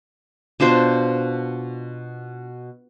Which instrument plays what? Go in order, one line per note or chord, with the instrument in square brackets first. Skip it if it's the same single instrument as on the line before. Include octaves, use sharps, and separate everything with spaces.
[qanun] B2 D4 F4 C5